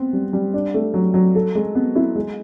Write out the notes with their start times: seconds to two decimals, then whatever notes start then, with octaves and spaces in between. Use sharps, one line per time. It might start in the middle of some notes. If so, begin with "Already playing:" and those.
Already playing: B3 C4
0.13 G3
0.33 G3
0.54 D4
0.74 A3
0.94 F#3
1.14 F#3
1.35 A4
1.55 G#3
1.75 B3
1.95 E4
2.15 G#3